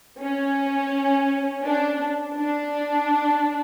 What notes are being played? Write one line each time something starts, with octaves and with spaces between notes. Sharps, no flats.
C#4
D4
D4